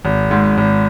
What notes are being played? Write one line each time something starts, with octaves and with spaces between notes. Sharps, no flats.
G#1
G#2
G#1